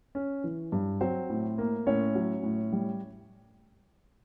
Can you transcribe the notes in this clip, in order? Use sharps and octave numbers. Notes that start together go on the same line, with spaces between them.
C#4
E3
G2
F#3 C4 C5
A2
A#3
A2 C#4 C#5
F#3
A2
G3